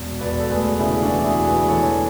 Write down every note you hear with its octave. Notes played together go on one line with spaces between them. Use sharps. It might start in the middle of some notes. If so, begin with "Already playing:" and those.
Already playing: E1
E1 B4 D5
A4
D2 G#4 B4
C#3 E4 G#4
D4 F#4
E3
E4 G#4
E1
G#4 B4
E3 A4 C#5